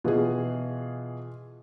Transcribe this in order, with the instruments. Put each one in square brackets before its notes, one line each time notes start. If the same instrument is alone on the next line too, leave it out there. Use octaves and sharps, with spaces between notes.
[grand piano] B2 E3 [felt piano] F4 G#4